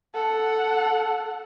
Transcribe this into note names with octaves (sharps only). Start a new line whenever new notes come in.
A4 F#5